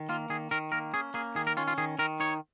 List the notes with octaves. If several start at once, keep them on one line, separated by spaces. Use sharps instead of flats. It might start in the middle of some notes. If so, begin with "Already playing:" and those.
Already playing: D#3
A#3 F4
D#3 G#4
D#3 A#4
A#3 A#4
C#4 G#4
A#3 G#4
D#3 G#4
A#4
C#4 F4
F4
D#3 G#4
D#3 A#4
D#4 C#5